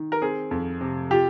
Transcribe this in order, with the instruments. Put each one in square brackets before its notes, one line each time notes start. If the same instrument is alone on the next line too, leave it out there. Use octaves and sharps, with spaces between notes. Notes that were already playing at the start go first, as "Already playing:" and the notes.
Already playing: [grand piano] D#3
A#4
C4 G#4
F2
C3
F4 G4